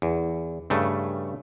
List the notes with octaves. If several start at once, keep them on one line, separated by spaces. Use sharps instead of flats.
E2
G2 C#3 A3